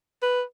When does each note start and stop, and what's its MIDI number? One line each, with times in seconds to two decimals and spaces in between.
0.22 0.41 71